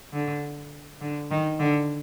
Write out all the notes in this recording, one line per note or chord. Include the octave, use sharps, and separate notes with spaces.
D3
D3
D#3
D3